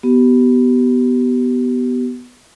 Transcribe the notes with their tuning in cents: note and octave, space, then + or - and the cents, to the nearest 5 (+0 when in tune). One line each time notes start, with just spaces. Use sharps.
B3 +5 G4 -30